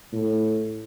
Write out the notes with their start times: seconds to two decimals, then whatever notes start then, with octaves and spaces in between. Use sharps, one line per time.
0.13 A2